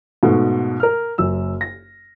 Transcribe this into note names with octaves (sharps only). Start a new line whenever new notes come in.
G#2 B2 A3 F#4
A#4 F6
F#1 F#2 E6
A#6